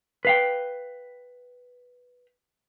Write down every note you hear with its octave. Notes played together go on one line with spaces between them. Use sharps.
B4 F5 G5